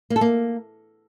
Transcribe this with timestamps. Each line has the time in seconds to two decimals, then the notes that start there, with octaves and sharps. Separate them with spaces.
0.10 A#3
0.16 A4
0.21 A#3